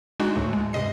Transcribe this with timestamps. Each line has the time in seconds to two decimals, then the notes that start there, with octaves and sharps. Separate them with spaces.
0.20 G#3 D4 D#4 F#4
0.36 D2 A2 A3
0.53 G#3
0.73 G2 C3 D#5 C7